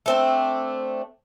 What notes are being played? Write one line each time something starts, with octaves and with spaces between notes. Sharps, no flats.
A3 C4 D4